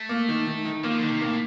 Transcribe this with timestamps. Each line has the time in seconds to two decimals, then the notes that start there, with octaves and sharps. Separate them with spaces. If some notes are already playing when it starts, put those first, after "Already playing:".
Already playing: A3
0.09 A#3
0.28 D#3
0.47 D#3
0.65 D#3
0.84 F3 A#3
0.98 D3 D#3
1.10 C3
1.21 A2 A#3